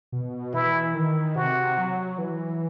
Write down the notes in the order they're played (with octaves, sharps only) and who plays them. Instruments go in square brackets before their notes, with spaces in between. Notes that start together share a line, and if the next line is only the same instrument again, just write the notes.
[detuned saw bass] B2
[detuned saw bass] E3 [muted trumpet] E4
[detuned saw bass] D#3
[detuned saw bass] C3 [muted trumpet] F#4
[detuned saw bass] F#3
E3